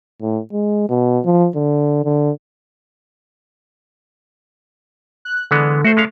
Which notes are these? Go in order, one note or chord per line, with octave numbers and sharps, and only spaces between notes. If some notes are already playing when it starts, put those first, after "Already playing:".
A2
G#3
B2
F3
D3
D3
F#6
D3 E3 G#3 B3
A3 F#4 C5
G#3 C#4 F5